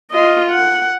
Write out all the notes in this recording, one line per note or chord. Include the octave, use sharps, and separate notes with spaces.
F4 D#5
F#5